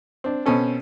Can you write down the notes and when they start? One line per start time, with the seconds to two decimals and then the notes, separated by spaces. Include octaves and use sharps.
0.24 C4 D4
0.46 B2 C4 C#4 A4